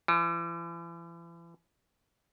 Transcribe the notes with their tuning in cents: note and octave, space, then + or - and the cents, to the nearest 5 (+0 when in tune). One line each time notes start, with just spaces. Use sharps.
E3 +40